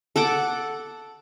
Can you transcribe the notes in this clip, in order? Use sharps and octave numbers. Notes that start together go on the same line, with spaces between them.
A4 F#5 D6